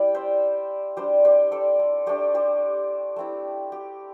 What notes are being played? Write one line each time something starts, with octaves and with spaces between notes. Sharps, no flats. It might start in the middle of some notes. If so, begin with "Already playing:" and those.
Already playing: G3 E4 D5 G5
C5 E5
G3 D4 G4 C5
G4 C5
A4 D5
A4
A3 D4 G4 C5
G4 C5
A3 C4 E4
G4